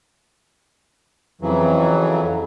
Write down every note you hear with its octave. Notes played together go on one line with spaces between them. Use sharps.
F2 C#3 E3 F#3